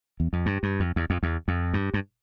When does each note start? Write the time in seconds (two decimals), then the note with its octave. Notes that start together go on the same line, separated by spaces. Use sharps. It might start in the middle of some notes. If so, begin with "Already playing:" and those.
0.20 E2
0.33 F2
0.46 G2
0.63 G2
0.80 F2
0.96 E2
1.10 F2
1.23 E2
1.48 F2
1.74 G2
1.94 G2